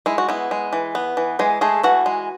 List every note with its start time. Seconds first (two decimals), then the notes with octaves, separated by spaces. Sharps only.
0.06 G#3 E4
0.18 F#4
0.29 B3 E4
0.51 G#3
0.73 E3
0.95 B3
1.17 E3
1.39 E3 G#3 G#4
1.61 G#3 A3 G#4
1.83 E3 F#4 F#5
2.06 G#3